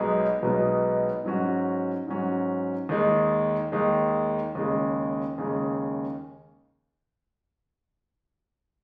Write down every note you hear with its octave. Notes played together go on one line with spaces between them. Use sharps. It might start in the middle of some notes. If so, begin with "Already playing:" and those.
Already playing: B1 B2 G#3 B3 D#4
B1 B2 G#3 B3 D#4
G#2 F#3 C#4 F#4
G#2 F#3 C#4 F#4
D#2 D#3 G#3
D#2 D#3 G#3
D#2 C#3 G#3
D#2 C#3 G#3